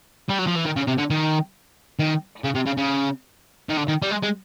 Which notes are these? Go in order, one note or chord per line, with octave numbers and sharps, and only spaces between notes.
G3
F#3
F3
E3
D#3
C#3
C3
D3
D#3
D#3
C#3
C3
C#3
C#3
D#3
D3
D#3
G3
G#3
G#3